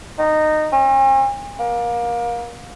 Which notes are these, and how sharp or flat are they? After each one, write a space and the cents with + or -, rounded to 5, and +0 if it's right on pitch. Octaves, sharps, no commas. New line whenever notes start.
D#4 -15
C#4 -45
A#3 +25